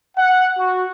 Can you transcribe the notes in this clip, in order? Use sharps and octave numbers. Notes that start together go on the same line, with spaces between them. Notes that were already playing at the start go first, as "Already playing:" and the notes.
F#5
F#4